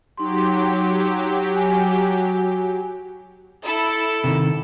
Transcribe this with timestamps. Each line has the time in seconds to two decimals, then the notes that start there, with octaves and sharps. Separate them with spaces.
0.17 F#3 D#4 G4 C6
1.55 F#4 G#5
3.63 E4 A4
4.24 C3 D#3